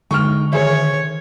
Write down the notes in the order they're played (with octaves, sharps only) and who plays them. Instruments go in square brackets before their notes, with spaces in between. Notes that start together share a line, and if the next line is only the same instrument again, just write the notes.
[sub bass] D3 [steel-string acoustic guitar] G#3 D#4 G5 [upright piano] C#6 F6
[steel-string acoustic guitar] D#3 [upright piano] G#4 E5 [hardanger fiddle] C#5